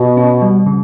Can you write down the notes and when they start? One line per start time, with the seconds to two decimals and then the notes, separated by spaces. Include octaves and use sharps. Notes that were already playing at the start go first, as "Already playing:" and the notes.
Already playing: B2
0.17 C#4
0.42 G3
0.66 C#3